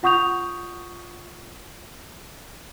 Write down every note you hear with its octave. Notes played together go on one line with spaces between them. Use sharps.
F4 F#5 C#6 D#6 G6 F7